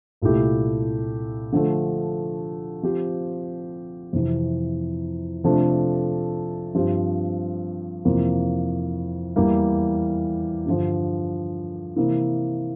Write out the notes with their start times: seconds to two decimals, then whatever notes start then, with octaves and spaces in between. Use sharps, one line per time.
0.22 C2 A#2 A3 E4 G4
1.52 D3 F3 A3
2.83 F3 C4 G4
4.13 F2 C3 E3
5.44 C3 F3 A3 D4 A4
6.75 G2 F3 C4 G4 C5
8.05 F2 C3 E3 A#3 F4
9.36 E2 E3 G3 A#3
10.66 G2 D3 F3
11.96 C3 E3 A#3 E4